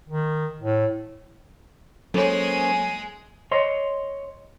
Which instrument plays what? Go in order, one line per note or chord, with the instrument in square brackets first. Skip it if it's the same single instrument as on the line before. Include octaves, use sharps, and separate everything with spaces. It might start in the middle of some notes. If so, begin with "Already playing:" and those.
[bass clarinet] D#3
A2
[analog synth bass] F#3 [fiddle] G#3 G#4 [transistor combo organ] A#3 C#4 C5 [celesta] A4 C#5
[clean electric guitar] C#5 D#5 C6